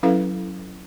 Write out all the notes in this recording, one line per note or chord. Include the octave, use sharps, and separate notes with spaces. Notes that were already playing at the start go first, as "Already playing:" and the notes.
F#3 C#4 E4 A4 B4 F5